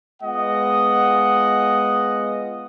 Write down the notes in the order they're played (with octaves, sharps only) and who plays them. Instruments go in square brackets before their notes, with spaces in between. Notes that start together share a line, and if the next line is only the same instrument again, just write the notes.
[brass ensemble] G#3 B3 F4 D#5 F#5